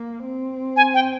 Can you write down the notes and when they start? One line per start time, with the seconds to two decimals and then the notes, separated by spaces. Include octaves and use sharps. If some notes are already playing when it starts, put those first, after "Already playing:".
Already playing: A#3
0.25 C4
0.76 G#5
0.94 G5